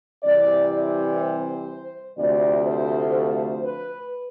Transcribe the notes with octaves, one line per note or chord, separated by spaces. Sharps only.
C3 E3 G3 C4 D5
D5
C5
D2 C3 F3 A3 D5
C5
C5
B4